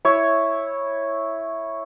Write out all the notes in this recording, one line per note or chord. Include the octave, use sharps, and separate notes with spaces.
E4 C#5